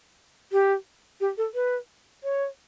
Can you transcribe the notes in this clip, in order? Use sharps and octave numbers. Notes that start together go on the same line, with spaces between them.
G4
G4
A4
B4
C#5